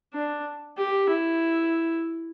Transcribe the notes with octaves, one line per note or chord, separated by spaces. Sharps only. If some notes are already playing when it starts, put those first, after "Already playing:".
D4
G4
E4